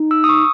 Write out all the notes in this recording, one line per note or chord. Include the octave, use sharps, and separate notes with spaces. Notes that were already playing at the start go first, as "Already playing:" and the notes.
Already playing: D#4
E6
D#6
C#6